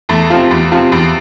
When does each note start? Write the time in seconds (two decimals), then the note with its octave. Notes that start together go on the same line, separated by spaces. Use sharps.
0.09 E2 A3
0.30 C3 F3
0.51 E2
0.72 C3 F3
0.92 E2